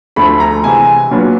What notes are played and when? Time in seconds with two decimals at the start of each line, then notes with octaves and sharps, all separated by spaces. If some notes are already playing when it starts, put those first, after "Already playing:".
0.16 D2 D3 F3 A3 B5
0.40 A#5
0.64 C3 E3 G#3 G#5
1.11 A#2 F#3 B3 D4